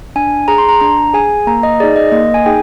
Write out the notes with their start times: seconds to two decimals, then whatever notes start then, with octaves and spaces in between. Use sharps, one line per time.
0.16 D4 G#5
0.48 G#4 A#5
0.58 C6
0.69 A#5
0.81 D4 A#5
1.14 G#4 G#5
1.47 A#3 A#5
1.63 D#5
1.80 G#4 D5
1.83 D#4
1.96 D#5
2.12 A#3 D#5
2.34 G#5
2.46 D#4 G#4 G5